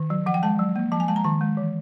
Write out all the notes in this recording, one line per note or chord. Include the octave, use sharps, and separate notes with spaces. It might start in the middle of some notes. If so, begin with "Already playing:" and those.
Already playing: D#3
F#3
F3 F#5
G5
G#3 A5
F#3
A#3
F3 A5
G#5
G#3 A5
A#5
D#3 A5
G#3
E3